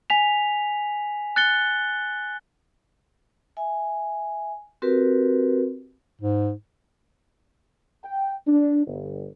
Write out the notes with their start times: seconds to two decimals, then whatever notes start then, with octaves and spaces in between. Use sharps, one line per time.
0.10 G#5 B6 F7
1.36 F#6 A6 C#7 G7
3.57 E5 G#5
4.82 C4 F#4 G4 A#4 B4
6.22 G#2
8.04 G5
8.47 D4
8.87 G1